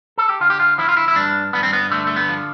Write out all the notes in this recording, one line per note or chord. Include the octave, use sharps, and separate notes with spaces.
A4
G4
D3 F4
G4
F4
F3 E4
F4
E4
E4
G2 D4
G2 B3
C4
B3
D3 A3
A3
B3
F3